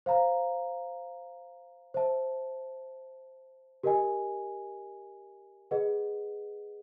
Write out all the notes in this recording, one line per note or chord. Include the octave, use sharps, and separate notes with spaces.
C5 F5 A#5
C5 E5 A5
G4 A#4 D#5 G#5
G#4 B4 D#5 F#5